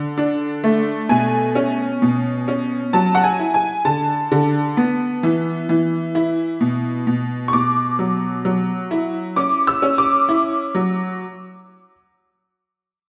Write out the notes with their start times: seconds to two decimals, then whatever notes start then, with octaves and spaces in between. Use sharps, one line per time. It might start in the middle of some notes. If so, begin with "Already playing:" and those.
Already playing: D3
0.18 D4
0.64 A3
1.09 B2 G#5
1.55 C#4
2.02 B2
2.48 C#4
2.93 F#3 A5
3.15 F#5
3.23 G#5
3.39 E4
3.54 G#5
3.85 D3 A5
4.32 D3
4.77 B3
5.23 E3
5.69 E3
6.15 E4
6.61 B2
7.07 B2
7.48 C#6
7.53 B2 D6
7.99 F#3
8.45 F#3
8.91 E4
9.36 C#4 D6
9.67 E6
9.82 C#4
9.98 D6
10.29 E4
10.75 F#3